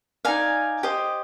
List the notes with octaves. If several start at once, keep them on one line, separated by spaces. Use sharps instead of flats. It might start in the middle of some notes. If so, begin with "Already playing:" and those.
D#4 A#4 D5 F5 G#5
G4 C5 D#5